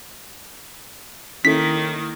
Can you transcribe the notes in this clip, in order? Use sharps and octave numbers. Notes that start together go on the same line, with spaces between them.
D#3 A#3 C#4 E4 A4 B6